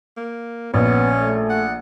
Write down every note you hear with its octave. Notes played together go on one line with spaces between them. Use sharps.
A#3
A#1 B3 C#4
A3
F#5